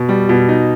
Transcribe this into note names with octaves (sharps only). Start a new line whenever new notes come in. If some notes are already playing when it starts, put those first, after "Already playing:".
Already playing: B2
G3
B2
D#4